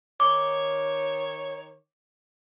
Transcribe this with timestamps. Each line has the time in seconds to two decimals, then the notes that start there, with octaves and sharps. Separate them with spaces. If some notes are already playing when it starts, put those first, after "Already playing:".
0.20 D#3 C#5 D6